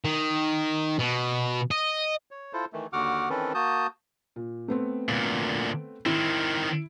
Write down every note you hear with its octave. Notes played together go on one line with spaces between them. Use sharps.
D#3
B2
D#5
C#5
E4 F4 A4 C5
D#3 E3 A3
D#2 D3 F#4 F#5 D6 F6
D#3 E3 C4 C#4 A4 B4
A#3 F#4 A5 D#6 G6
A#2
A3 B3 C4
D2 A#2
D#3 C4 E4